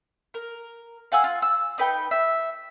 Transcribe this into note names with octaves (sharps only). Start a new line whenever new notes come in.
A#4
F5 F#5 G#5 E6
F4
E6
D#4 B4 G5
E5